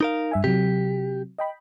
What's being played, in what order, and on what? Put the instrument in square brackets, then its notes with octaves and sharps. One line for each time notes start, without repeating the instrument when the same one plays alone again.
[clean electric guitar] D#4 A#4 F5
[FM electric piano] G2 E5 G#5
[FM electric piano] C3 F#3 [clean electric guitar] G4
[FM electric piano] D#5 G5 B5